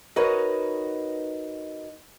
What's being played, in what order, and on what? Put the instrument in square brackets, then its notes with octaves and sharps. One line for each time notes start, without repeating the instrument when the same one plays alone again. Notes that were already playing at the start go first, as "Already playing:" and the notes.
[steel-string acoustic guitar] D#4 F#4 A#4 B4 C#5 D#5